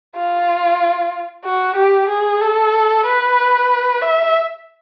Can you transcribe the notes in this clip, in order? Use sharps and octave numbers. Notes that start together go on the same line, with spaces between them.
F4
F#4
G4
G#4
A4
B4
E5